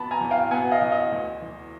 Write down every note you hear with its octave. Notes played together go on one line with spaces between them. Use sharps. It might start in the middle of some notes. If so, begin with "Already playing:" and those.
Already playing: F2 B3 A5 B5
G#5 A#5
E2
F5 G5
B3 F#5 G#5
D#5 F5
E2
D#5 F5
D2
E3